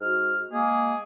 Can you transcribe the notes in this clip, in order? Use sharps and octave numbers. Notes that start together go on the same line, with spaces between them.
G#2 F#4 F6
G#3 A#3 G#4